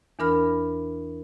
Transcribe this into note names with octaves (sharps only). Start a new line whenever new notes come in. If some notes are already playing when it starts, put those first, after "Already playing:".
E2 E3 D4 A#4 B5 F6